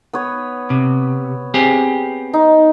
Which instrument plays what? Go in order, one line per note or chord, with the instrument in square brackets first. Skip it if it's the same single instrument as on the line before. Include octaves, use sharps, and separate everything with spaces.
[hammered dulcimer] B3 B4 C#5
[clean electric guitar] C3
C4 G4 G#4
[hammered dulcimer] D#4